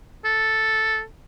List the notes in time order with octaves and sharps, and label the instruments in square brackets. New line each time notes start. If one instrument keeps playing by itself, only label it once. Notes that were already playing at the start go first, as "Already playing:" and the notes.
[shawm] A4